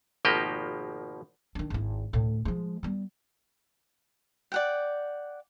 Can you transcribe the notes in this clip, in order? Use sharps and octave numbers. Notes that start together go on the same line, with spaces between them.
G#1 B2 F3 A#3 G4 D#5
D#3 D4
G#1 E4
D2 A2
F3 G#3
G3 B3
D5 F#5 G5